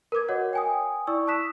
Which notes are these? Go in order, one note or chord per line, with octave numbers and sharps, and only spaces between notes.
A#4 B4 D6 G#6
F#4 A#4 C#5 D#5 F#5
G5 G#5 D#6
E4 D5 C#6 E6
A5 D#6 F#6 B6 E7